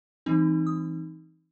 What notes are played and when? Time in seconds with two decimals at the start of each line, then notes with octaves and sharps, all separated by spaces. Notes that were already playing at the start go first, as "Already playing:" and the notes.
0.26 E3 G3 C4 D#4
0.67 D#6